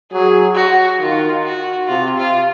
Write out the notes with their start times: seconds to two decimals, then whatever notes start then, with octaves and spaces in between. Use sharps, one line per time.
0.12 F#3 G#4
0.56 F#4
0.99 D#3 F4
1.44 F#4
1.88 C3 F4
2.18 F4